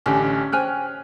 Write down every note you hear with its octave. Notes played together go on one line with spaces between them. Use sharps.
A1 D3 C#4 G4
C5 G5 G#5 F6 F#6